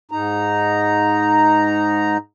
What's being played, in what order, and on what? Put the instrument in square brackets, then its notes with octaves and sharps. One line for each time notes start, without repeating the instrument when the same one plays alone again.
[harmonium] G#2 D#4 A#5